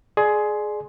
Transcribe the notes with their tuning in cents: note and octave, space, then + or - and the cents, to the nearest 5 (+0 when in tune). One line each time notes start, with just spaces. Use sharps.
G#4 +20 D5 +25 C6 +0